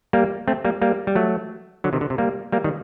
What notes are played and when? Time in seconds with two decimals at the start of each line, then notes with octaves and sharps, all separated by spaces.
0.13 G3 A#3
0.48 A3 C4
0.65 G3 A#3
0.82 G3 A#3
1.07 G3
1.15 F#3 A3
1.84 D3 F#3
1.93 C3 D#3
2.01 D3
2.10 C3
2.18 G3 A#3
2.52 G3 A#3
2.64 D#3 G3